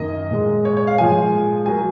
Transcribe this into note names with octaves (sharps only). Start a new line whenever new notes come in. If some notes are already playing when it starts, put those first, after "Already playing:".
Already playing: F#2 D#3 A#3 D#5
A#2 G#3
C#5
C#5
F5
A#2 F3 G#3 G#5
F#3 A#3 G#5